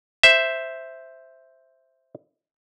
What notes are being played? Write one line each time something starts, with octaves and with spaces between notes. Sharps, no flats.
C5 E5